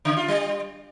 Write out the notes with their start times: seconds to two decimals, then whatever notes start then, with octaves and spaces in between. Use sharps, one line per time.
0.05 C#3
0.17 F4
0.28 G3